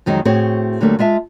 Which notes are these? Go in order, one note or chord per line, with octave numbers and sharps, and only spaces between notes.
F2 D#3 F#3 G#3 D#4
A2 C4 F#4 G#4 C#5
D2 D3 F#3 G3 A3 A#3
G#3 F4 E5 A5